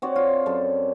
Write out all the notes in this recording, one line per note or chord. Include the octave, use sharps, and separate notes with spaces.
C4 F#4 C#5 D5
F4
F#2 A4